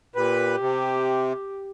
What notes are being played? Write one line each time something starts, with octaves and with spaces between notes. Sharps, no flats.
A#2 G4 B4
C3